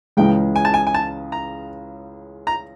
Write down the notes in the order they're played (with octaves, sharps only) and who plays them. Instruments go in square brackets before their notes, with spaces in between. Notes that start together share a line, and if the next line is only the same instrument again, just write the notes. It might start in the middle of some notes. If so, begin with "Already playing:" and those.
[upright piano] C#2 C#3 E3 G#3 [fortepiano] G5
[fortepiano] G#5
A5
G#5
G#5
A5
A#5
A#5